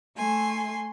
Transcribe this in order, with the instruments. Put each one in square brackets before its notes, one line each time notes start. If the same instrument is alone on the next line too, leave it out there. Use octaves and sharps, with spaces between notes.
[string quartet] A3 G#5 C6